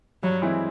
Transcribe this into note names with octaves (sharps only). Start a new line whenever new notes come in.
G2 F#3
E3 G#3 C4 E4